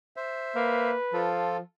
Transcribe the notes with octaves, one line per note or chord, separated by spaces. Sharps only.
C5 E5
A#3 B4
F3 F4 A4